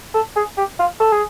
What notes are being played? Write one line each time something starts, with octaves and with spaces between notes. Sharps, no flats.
A4
G#4
G4
F4
A4
G#4